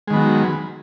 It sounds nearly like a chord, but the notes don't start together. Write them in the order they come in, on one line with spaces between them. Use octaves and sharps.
G#3 D#3 B3 F#3